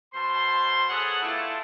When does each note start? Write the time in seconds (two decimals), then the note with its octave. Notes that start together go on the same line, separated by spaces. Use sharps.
0.13 B2 C5 A5 C6
0.89 B3 G#4 A4 C#5 F#5
1.22 A3 E4 F4 D5 A5